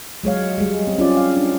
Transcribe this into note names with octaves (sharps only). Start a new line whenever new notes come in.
F#3 G#3 C#5 F5
G3 G#3
C4
C#4 F4 D5
F5
D4